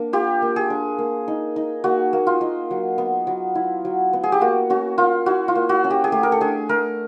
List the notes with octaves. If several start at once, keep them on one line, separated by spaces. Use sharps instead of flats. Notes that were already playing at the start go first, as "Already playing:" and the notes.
Already playing: A#3 D4
F4 G4
A#3
G#4
D4
A#3
D#4
D#4
A#3 F#4
A#3
F4
D#4
F#3
B3
F#3
E4
F#3
B3
G#4
G4
A#3 F#4
C#4 F#4
A#3 F4
E4 F#4
F4
A#3
F#4
C#4
G4
G#4
A3 G4
A#4
A4
D4 G#4
A3 A#4